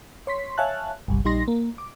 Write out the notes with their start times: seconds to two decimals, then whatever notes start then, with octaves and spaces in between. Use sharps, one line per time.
0.27 C#5 C6 B6
0.58 C#5 E5 F5 G#5 A5 F#6
1.08 G1 C2 G3
1.25 A#1 G3 D#4 C6 A#6
1.48 A#3
1.78 D6